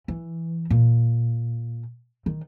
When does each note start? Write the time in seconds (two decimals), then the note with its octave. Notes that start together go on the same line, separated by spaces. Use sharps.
0.08 E3
0.70 A#2
2.26 D#3